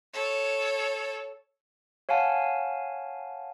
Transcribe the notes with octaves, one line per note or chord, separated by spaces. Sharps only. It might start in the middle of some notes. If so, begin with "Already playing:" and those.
A4 C#5
C#5 F5 F#5 G#5 A5